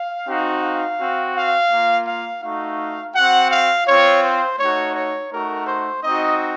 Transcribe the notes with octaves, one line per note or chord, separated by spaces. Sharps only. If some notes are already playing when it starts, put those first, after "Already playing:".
Already playing: F5
C4 D#4 F#4
F5
C4 F#4
F5
A#3 F4
F5
A3 D#4 F#4 F5
C4 F#4 F#5
F5
C4 F4 C#5
C5
A3 D#4 F#4 C#5
C#5
A3 D#4 F#4 A#4
C5
C4 D#4 F#4 D#5